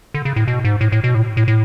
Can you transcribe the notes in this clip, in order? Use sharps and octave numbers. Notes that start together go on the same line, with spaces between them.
D3
C#3
A2
B2
G#2
A2
A2
B2
A2
A2
A2